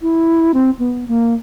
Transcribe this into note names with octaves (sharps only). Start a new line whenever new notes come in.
E4
C4
B3
A#3